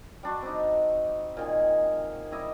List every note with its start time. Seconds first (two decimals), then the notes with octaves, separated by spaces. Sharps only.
0.23 G3 D4 F#4
0.42 C4 D#4
1.37 A#2 D#3 G#4
2.31 G3 E4 D#5